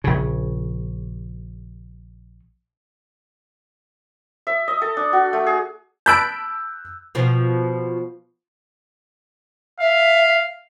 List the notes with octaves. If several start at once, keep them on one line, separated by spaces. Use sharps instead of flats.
A#1 C#3
E5
D#5
A4
D4
F#4
A3
G#4
A5 B5 E6 F#6 G6 D7
B2 F3
E5 F5